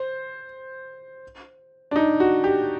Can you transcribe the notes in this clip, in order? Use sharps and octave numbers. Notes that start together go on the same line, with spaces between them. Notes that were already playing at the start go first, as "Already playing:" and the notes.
Already playing: C5
D4
D#4
F#4
G4